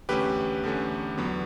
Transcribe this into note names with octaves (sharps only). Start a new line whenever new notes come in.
E2 D3 A3 C#4 G4 B4
E2 D3 A3 C#4
E2 D3 F#3 B3